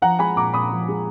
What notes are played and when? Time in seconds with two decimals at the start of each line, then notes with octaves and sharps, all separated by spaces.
0.02 F3 F#5 A#5
0.19 G#3 G#5 B5
0.36 A#2 A#5 D6
0.53 A#2 B5 D#6
0.71 F3
0.88 G#3